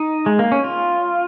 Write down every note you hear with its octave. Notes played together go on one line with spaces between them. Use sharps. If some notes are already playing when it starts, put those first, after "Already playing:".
Already playing: D#4
G#3
A#3
C#4
F4